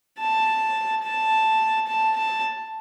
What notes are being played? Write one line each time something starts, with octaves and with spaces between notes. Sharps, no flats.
A5
A5
A5
A5